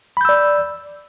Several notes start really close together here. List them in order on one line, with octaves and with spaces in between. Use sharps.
B5 G6 E6 D5